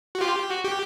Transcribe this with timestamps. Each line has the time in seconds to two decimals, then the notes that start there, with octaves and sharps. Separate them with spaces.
0.15 F#4
0.20 F4 G4
0.50 F#4
0.64 G4